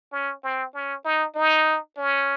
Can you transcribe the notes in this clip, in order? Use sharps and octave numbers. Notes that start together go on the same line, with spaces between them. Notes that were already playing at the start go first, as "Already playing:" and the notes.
C#4
C4
C#4
D#4
D#4
C#4